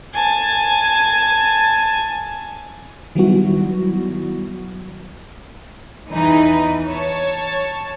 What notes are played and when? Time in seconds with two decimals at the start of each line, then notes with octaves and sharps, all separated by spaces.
0.13 G#5 A5
3.15 D#3 F#3 G3 B3 E4 F#4
6.10 E2 E3 D#4 B4
6.86 C#5 A5